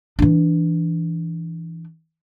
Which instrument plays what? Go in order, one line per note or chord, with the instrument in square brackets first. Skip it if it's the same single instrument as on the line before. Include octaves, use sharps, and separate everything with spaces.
[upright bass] E3 D4